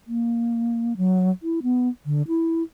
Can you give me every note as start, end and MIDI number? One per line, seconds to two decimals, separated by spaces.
0.07 0.97 58
0.97 1.31 54
1.43 1.59 64
1.63 1.89 59
2.06 2.22 50
2.28 2.63 64